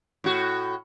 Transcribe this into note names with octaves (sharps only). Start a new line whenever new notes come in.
A2 F#4